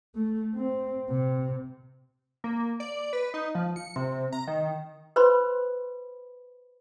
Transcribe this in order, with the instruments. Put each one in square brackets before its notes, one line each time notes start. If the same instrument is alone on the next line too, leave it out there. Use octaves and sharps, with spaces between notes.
[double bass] A3
C4
C3
[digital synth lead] A#3
D5
B4
D#4
F3
C#7
C3
A#5
D#3
[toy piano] B4 C5 B5 C6